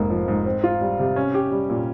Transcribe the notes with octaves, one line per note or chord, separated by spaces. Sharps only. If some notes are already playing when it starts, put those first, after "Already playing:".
Already playing: F1 G#2 A#3
F3
G#2
C4
F4
G3
C3
C#4
G4
G3
A#2